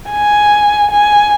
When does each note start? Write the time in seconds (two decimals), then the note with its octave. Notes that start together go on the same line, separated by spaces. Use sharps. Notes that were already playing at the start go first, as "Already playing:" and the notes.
0.11 G#5
0.91 G#5